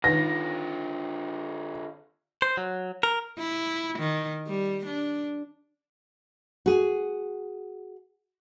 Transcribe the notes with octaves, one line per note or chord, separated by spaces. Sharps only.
D3 D#3 D#4 F4 B4 A#6
C5
F#3
A#4
E4
D#3
G3
D4
F#4 G#4